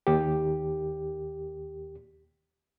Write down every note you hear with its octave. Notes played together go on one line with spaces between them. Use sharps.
D#2 G4